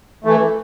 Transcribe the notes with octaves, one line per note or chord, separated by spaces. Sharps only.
E3 A3